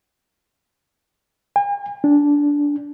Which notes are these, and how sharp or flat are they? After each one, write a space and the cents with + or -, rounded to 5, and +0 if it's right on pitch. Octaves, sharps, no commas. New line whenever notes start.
G#5 -45
D4 -15